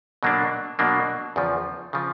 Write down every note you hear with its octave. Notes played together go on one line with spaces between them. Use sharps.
B2 F#3 A#3 D4
B2 F#3 A#3 D4
E2 C#3 F3
C#3 F3